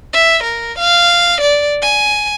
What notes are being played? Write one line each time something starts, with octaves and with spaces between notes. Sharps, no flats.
E5
A#4
F5
D5
G#5